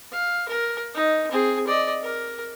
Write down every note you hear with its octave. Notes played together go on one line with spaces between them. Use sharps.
F5
A#4
D#4
C4 G#4
D5 D#5
A#4